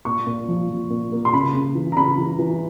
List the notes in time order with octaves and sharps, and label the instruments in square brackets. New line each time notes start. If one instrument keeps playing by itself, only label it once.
[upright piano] A#2 C#6
A#2
F3
F3
A#2
A#3
C6
C#3 B5
C#3
E3
A#5
C#3 B5
E3
E3